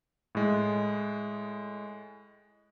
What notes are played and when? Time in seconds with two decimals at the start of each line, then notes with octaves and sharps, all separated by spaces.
0.35 A2 G#3